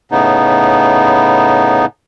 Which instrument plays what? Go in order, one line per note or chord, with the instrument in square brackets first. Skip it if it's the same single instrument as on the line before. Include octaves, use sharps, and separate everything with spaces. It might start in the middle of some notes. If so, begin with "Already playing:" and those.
[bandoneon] A2 C#3 B3 D#4